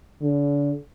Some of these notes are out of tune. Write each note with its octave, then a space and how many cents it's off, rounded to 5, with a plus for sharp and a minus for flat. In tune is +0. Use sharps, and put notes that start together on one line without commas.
D3 -35